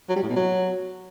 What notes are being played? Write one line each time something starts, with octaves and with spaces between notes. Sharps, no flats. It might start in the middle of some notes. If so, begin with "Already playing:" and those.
F#3
G3
A2
B2
F#3